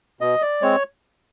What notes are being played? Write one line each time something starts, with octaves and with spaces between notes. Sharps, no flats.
B2 D#5
D5
G#3 C4 C#5